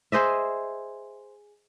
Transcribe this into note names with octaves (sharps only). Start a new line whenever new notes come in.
G#4 C5 D#5 E5